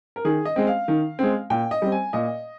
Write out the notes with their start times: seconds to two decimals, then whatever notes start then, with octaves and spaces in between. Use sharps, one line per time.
0.16 A#4
0.25 D#3 G#4
0.45 D#5
0.56 G#3 C4
0.67 F5
0.88 D#3
1.19 G#3 C4
1.50 A#2 G5
1.71 D#5
1.82 G3 C4
1.92 G#5
2.13 A#2 D#5